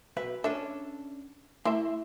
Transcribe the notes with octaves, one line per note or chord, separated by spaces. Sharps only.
B1 B4 E5
C#4 D4 A4 E5
A3 E4 E5 C6